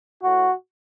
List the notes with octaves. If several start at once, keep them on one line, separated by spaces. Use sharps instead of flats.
A2 F#4